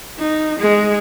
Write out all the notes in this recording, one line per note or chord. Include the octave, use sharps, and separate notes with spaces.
D#4
G#3